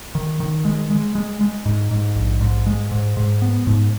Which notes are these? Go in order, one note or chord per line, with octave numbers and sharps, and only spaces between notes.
D#3
D#3
G#3
G#3
G#3
G#3
G#2
G#2
A#1
G#2
G#3
G#2
G#2
B3
G#2